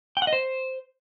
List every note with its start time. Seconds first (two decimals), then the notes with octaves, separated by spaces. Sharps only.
0.17 G5
0.22 F#5
0.27 D#5
0.33 C5